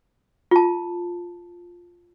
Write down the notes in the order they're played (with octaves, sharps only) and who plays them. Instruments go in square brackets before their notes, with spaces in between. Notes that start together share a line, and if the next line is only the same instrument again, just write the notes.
[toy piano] F4 A5